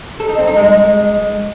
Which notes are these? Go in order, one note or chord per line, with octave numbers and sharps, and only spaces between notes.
A4
D#4
C4
D#4
G#3